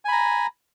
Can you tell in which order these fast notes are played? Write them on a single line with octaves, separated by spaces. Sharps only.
G#5 B5 A#5